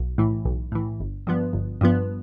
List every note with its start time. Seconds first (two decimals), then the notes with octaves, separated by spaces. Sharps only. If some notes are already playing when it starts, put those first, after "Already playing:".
Already playing: B1
0.18 A2 E3
0.45 B1
0.72 A2 E3
1.00 G1
1.27 G2 F3 B3
1.53 G1
1.81 G2 F3 B3